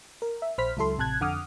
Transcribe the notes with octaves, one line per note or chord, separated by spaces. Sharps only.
A#4
E5
A#1 C5 B5 F6 B6
C#2 F#3 E4 A4 C6
A1 C3 A5 F#6 G#6
F2 D3 F#5 D6 D#6 F6